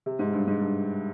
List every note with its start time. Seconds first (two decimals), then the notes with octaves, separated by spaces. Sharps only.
0.06 C3
0.19 G#2
0.33 G2
0.47 G#2
0.61 G2